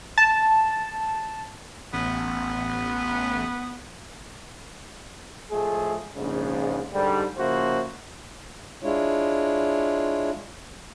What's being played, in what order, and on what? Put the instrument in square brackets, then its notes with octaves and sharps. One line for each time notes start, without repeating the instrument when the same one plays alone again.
[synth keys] A5
[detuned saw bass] A1 [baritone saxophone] B3
[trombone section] A2 F3 G#3 A3 G#4
A#1 G#2 C#3
G#2 D3 G3
C#3 F3 A#3 E4 F#4 C5
[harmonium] G#3 D4 E4 F4 C#5